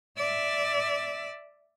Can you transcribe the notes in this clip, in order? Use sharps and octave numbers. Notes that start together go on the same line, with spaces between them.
D5 E5